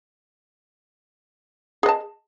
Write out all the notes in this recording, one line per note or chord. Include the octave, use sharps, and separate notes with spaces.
G#4 D#5 A5